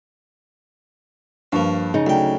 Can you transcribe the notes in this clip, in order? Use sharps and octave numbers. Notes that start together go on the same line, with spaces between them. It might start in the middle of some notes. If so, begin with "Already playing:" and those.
G2 F3 A#3 C#6
C#3 D#4
D2 F#3 G5